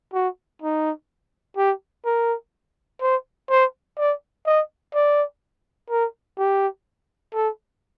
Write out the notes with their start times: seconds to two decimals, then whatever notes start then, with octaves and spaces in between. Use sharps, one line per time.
0.14 F#4
0.62 D#4
1.57 G4
2.05 A#4
3.01 C5
3.50 C5
3.98 D5
4.46 D#5
4.94 D5
5.90 A#4
6.38 G4
7.34 A4